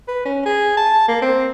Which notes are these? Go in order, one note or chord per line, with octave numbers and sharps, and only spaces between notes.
B4
C#4
G#4
A5
A#3
C4